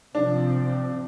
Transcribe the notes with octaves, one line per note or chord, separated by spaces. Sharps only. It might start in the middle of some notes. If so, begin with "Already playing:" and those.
C3 F3 C4 D4